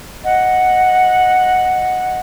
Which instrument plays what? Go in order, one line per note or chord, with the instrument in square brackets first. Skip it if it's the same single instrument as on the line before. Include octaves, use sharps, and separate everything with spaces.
[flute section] D#5 F#5